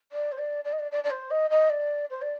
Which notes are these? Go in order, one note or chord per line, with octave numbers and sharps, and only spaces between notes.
D5
C5
D5
D5
D#5
D5
D5
D5
C5
D#5
D#5
D5
C5
D5